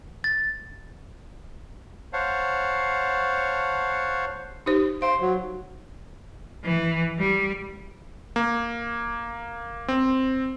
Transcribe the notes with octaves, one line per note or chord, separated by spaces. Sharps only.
A6
C5 C#5 F5 F#5 A5
D#4 G4 C5
C5 F5
F#3
E3
G3
A#3
C4